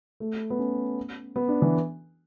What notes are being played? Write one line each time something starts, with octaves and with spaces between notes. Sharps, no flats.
A3
B3
C#4
B3
D4
E3